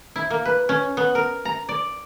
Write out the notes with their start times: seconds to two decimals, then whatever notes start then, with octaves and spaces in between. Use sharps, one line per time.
0.16 E4
0.30 A#3
0.45 B4
0.69 C#4
0.97 B3
1.15 A#4
1.45 A#5
1.69 D5